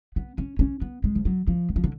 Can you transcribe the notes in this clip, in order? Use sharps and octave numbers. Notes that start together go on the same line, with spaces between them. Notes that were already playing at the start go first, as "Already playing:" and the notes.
B3
C#4
C#4
B3
G#3
F3
F#3
F3
D3
F3
D3